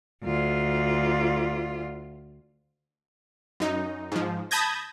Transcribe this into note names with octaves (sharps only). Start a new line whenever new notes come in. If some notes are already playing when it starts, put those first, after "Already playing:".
D2 F4
F#2 D#4
G#2 F3
A5 B5 D#6 G6 G#6 A#6